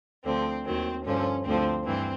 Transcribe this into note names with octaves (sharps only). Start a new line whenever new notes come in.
D2 D3 F3 C4
D#2 D#3 F#3 C4
G2 D3 F3 C#4
D2 D3 F3 C4
G2 E3 C4